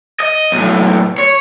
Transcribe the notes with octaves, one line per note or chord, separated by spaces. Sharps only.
D#5
B1 A2
C#5